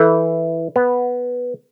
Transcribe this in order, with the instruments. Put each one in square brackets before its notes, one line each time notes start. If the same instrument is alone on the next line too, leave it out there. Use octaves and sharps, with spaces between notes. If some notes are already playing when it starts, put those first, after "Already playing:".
Already playing: [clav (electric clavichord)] E3 [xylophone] A4 E5 B5 E6 G6
[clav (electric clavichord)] B3